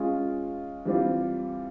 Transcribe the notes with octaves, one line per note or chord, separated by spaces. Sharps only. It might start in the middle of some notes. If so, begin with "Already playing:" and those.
Already playing: G#3 C#4 F4
E3 G3 C4 F4